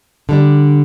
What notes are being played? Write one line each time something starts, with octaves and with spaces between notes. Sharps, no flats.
D3 G3 D4